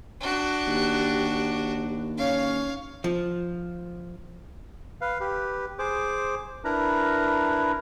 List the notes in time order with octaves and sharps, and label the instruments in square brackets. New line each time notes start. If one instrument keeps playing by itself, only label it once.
[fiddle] D4 F#4
[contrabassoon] D#2 [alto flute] G4
[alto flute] C#4 [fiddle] C#5 F5
[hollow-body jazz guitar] F3
[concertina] B4 F5
G4 B4
G#4 C5 D6
D4 E4 A#4 B4 A#5